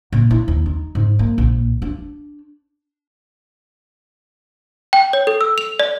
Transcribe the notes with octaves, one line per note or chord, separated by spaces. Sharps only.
A#2
E4
D#2
D#4
G#2
A#3
A#1
D4
G5
C#5
A4
E6
F7
D5